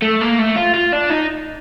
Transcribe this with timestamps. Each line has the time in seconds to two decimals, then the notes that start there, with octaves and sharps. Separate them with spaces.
0.02 A3
0.21 A#3
0.39 A3
0.56 F4
0.74 F4
0.93 D4
1.10 D#4